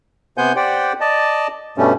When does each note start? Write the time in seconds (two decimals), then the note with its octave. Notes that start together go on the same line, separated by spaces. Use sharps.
0.38 C3 B3 C5 F#5 G#5 G6
0.56 G4 C5 D5 F#5 G5
1.01 D5 D#5 A5
1.78 G2 B2 G3 A3 C#4